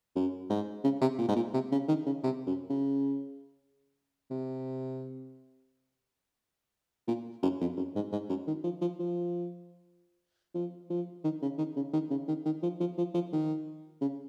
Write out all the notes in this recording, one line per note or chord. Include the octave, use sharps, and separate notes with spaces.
F#2
G#2
C#3
C3
A#2
G#2
A#2
C3
C#3
D#3
C#3
C3
F#2
C#3
C3
A#2
F#2
F2
F#2
G#2
G#2
F#2
D#3
F3
F3
F3
F3
F3
D#3
C#3
D#3
C#3
D#3
C#3
D#3
D#3
F3
F3
F3
F3
D#3
C#3